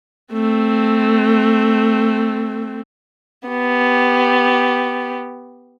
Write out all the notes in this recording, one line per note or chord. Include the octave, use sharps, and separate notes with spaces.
A3 C4
B3 G4